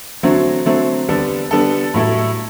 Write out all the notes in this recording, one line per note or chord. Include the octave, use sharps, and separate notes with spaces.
D3 F#3 A3 C4
D3 F#3 A3 C4
D3 G3 B3 D4 A4
D3 G3 B3 D4 A4
A2 F#3 A3 E4 A4